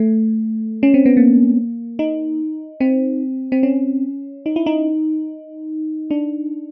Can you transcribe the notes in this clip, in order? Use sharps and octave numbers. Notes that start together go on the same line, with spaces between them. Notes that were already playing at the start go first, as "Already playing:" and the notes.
Already playing: A3
C#4
C4
B3
A#3
D#4
C4
C4
C#4
D#4
E4
D#4
D4